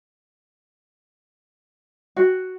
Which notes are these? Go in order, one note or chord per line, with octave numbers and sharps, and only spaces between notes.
F#4